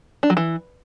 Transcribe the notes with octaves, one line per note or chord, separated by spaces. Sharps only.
D4
F#3
E3